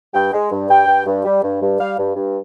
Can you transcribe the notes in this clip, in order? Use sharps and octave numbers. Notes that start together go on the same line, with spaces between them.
G2 G5
G#3
G2
G2 G5
G2
G2
G3
G2
G2
G3 F5
G2
G2